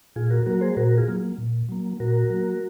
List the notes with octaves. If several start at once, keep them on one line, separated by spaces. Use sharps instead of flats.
A#2 F4 G#4
F#4 A#4
F#3 A#3 F#4 A#4
G#4 C5
A#2 F#4 A#4
F4 G#4
F#3 A#3
A#2
F#3 A#3
A#2 F#4 A#4
F#3 A#3